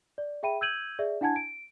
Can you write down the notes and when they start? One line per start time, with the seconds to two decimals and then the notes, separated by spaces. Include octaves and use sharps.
0.18 D5
0.43 G#4 E5 G5 B5 D#7
0.61 E6 G6 G#6 D#7 F#7
0.99 G#4 D5 E5
1.21 D4 E4 F#5 G#5 A5 G#6
1.36 D7